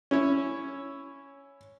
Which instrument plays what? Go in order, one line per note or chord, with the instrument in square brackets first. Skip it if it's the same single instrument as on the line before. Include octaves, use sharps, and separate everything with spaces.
[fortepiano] C#4 E4 C#5